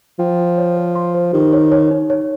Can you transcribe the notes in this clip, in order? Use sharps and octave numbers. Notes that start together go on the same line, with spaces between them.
F3 G5
G5
C#5
C5
C6
C5
D#3 G4
C#5
C#5
D#4
C#5